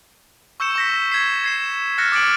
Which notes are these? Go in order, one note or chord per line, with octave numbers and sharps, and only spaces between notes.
C#6 E6 G6 C#7 E7
C#6 A#6 B6
G#6 B6 C7
G#6 C7 E7
F6 F#6 A6 A#6 C#7
D6 F6 A6 C#7 D7 F#7